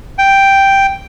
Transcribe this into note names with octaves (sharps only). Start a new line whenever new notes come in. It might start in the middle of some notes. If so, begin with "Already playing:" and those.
G5